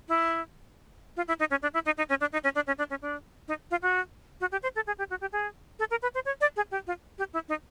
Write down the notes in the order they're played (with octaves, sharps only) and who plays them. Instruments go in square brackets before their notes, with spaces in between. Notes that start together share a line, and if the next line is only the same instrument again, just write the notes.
[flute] E4
F4
E4
D#4
C#4
D4
E4
D#4
D#4
C#4
D4
D#4
C#4
D4
C#4
D4
C#4
D4
D#4
F4
F#4
F#4
G4
C5
A4
G#4
G4
F#4
G4
G#4
A4
A#4
B4
C5
C#5
D5
G#4
G4
F4
G4
E4
D#4